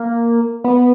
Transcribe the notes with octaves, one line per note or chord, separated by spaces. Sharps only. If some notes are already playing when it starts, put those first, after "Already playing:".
Already playing: A#3
B3